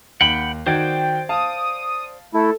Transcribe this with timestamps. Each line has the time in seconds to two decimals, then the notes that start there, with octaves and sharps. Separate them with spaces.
0.21 D#2 F#5 G5 B5 F#7
0.67 D#3 F#4 C5 D5 G5 G#6
1.29 F5 A5 D#6
2.34 A3 E4 A4